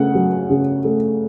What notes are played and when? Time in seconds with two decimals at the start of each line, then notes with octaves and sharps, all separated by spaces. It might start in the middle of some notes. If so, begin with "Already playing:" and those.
Already playing: C#3 A3 F#5
0.15 F#3
0.50 C#3
0.85 A3